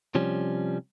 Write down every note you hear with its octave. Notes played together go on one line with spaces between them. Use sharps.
C3 F3 G3 C#4